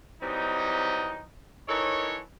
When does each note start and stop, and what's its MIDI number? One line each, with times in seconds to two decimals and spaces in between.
0.21 1.22 52
0.21 1.22 54
0.21 1.22 55
0.21 1.22 60
0.21 1.22 63
1.68 2.20 52
1.68 2.20 63
1.68 2.20 69
1.68 2.20 70
1.68 2.20 73